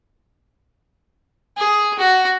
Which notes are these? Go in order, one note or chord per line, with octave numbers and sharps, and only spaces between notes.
G#4
F#4